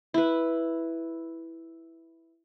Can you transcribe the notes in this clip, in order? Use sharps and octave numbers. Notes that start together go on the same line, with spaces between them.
E4 B4